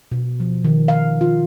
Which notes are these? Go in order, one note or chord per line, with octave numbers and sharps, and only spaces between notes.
B2
F3
D#3
F5
F4